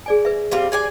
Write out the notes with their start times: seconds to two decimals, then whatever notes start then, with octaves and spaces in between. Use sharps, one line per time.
0.06 G#4 D5 G#5
0.25 B4 E5
0.51 G3 C4 F4
0.72 G#4 D5 G#5